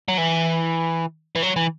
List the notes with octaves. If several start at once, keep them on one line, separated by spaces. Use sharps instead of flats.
F#3
E3
E3
F#3
E3